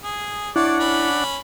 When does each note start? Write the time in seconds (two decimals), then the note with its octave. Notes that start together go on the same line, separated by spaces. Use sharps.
0.04 G#4
0.56 D4 E4 C#5 D5 F#5
0.80 C#4 B5